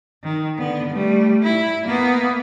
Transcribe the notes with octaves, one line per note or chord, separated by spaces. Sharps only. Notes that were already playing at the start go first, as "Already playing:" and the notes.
D#3
D3 B3
G3 A3
E4
A#3 B3